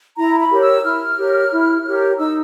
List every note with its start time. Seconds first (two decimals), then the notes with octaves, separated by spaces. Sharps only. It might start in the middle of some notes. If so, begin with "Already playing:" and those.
0.17 E4 A#5
0.39 B5
0.51 G4 A#4 C#5
0.61 E6
0.84 E4 F6
1.18 G4 A#4 C#5
1.51 E4
1.85 G4 A#4 C#5
2.19 D#4 E6